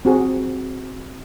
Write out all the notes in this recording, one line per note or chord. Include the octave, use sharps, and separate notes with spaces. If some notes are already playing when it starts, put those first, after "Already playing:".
C4 F#4 G#4